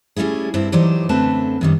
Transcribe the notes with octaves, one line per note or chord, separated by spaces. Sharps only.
G3 A3 C#4 E4 G#4
G2 C4 E4 A5
E3 F#3 D#4 G4 C5 D5
F#2 D3 A3 C4 B4 A5
F#2 D#3 G3